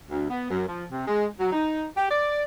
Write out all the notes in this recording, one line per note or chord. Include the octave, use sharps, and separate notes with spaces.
D2
B3
F#2
F3
C3
G#3
F#3
D#4
G4
D5